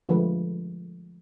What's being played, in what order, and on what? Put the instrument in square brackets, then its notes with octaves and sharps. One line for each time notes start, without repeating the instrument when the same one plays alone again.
[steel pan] D3 F3 G#3 A3 B4